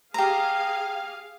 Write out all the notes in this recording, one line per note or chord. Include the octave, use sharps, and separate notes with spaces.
G4 G#4 F5 A#5